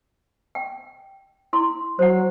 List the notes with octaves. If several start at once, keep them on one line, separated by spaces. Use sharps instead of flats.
G5
E4 C6
F#3 C5 F#5